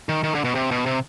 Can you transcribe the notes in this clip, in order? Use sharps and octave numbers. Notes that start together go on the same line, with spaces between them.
D#3
D#3
D3
B2
C3
B2
C3